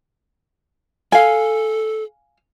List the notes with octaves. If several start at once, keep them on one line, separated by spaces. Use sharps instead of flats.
A4 F5 G#5